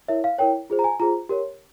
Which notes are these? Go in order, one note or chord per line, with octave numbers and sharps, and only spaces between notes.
E4 A#4 C#5 E5
F5
E4 A#4 C#5 G5
F4 G#4 C5
A#5
G#5
F4 G#4 C5 A#5
G4 A#4 C#5